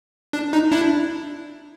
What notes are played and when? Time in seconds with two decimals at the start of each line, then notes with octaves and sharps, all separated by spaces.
0.33 D4
0.53 D#4
0.72 D4 E4